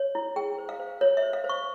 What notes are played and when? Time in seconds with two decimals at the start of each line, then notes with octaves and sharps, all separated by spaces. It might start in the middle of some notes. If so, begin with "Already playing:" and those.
Already playing: C#5
0.15 E4
0.36 G#4 G5
0.58 C5
0.69 F5
0.79 C5
1.01 F4 C#5
1.17 E5
1.23 C5
1.33 F5
1.44 C5
1.49 C#6